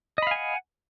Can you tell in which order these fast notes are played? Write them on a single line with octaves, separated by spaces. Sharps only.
D#5 B5 F5 G#5 F#5